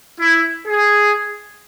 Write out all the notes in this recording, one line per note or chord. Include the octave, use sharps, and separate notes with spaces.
E4
G#4